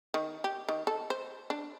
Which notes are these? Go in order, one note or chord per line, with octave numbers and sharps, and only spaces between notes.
D#3
G4
D#3
A4
C5
D4